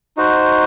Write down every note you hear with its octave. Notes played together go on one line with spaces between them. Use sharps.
D#4 F#4 C5